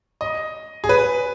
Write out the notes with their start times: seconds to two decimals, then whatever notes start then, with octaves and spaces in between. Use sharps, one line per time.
0.21 D#5
0.84 G#4
0.89 B4